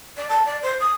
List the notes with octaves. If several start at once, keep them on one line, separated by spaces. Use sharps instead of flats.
D5
A5
D5
C5
D#6